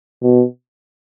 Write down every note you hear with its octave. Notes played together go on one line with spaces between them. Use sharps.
B2